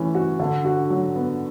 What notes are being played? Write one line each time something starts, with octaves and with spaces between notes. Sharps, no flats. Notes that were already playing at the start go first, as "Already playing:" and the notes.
Already playing: E3 A3 C#4
F#4
D3
F#4
F#3
B3